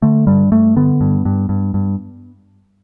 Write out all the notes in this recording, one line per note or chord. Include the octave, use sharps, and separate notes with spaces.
D3 A3
G2 G3
G2 A3
D3 B3
G2
G2
G2
G2